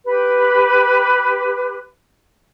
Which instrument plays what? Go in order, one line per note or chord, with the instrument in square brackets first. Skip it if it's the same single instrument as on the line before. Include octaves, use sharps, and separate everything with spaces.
[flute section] G4 B4